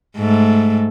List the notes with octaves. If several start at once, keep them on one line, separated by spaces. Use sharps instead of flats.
G#2 A3